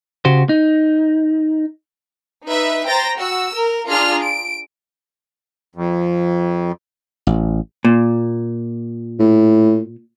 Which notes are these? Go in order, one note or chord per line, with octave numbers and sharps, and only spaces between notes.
C#3 F#4 G4 C5
D#4
D#4 B4 E5
C5 G5 A#5 A6 A#6
F#4 E6
A#4
D4 F4 G#4 A#5 F6
D7
F2
A1
A#2
A2